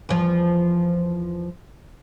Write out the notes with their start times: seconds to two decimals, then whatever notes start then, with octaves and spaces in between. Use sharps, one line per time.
0.09 E2 F3